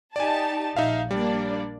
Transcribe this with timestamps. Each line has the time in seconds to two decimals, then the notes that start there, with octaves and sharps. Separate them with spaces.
0.16 D#4 G4 D5 G#5 A5
0.76 A#1 D#4 E5 F5
1.11 G3 A#3 D4 D5